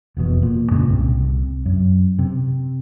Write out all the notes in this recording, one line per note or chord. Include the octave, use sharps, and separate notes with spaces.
F1 E2 B2
A#2
G2 A#2 C#3 G#3
C2 C3
F#2
C3